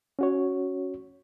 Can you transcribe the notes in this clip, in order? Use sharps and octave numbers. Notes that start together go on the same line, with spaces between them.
C#4 F#4 C#5